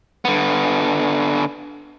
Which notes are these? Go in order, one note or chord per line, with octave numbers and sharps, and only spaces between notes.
D3 B3